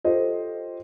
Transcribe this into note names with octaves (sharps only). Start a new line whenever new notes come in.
F4 G4 A4 C5 D#5